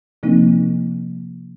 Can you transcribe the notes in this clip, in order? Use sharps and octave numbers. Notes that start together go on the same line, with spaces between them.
C3 F3 A#3 C4 D#4